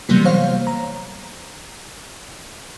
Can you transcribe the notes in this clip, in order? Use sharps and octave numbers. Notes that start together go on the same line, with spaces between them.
C3 E3 F#3 G3 A#3 B3
C5 C#5 F5
A#5